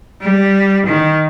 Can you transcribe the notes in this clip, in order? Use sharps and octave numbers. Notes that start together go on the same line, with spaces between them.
G3
D#3